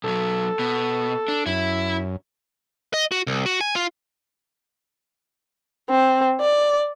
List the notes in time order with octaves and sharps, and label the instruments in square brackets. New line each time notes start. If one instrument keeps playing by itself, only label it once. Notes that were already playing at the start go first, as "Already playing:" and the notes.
[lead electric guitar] B1 F#3 [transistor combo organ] A4
[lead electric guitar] B2
D4
[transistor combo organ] F#2 [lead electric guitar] E4
[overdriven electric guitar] D#5
F#4
C2
F#4
G#5
F4
[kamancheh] C4
D5